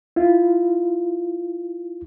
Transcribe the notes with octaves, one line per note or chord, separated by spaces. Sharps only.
E4 F4